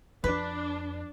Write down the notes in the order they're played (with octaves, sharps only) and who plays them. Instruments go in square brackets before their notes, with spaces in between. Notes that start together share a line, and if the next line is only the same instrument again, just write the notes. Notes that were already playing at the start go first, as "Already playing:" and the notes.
[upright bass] F2 [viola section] D4 [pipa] B4